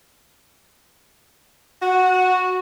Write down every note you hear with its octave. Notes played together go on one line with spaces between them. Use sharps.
F#4